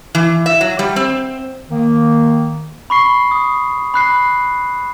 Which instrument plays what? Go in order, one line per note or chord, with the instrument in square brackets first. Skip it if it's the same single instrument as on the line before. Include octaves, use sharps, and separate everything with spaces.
[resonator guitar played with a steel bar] E3
E5
F#3
G3
C4
[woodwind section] D#3 A#3
[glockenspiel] B5 C#6 C7
D#6
B5 F#6 C7